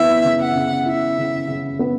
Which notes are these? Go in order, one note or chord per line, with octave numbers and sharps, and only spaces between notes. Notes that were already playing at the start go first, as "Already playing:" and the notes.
Already playing: E3 B3 E4 E5
C#3
F#5
C#3
E4 E5
C#3
C#3
B3